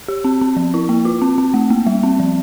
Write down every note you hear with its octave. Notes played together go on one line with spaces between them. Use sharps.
G4
C4
C4
F3
E4
A#3
F4
C4
C4
A3
A#3
G3
C4
F3